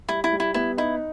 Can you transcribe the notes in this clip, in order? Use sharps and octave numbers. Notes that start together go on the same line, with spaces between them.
G3 E4
E4
G3
E4
B3 E4
D#4 E4